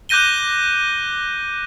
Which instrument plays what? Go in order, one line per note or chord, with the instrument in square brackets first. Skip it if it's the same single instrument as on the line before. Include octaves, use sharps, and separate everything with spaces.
[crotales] D6 F#6 G6 A#6 D#7 G7